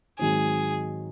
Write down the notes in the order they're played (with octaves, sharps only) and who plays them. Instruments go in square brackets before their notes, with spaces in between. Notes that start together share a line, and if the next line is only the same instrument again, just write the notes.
[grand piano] G#2 D#3 F#3 C4 [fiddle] G#4